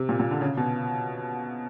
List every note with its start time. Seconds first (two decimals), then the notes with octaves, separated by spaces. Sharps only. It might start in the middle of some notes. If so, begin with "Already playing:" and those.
Already playing: C3
0.09 A#2
0.20 A#2
0.31 D3
0.41 C#3
0.57 B2